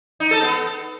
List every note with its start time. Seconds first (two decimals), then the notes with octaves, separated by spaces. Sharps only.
0.20 D#4
0.31 A4
0.42 B3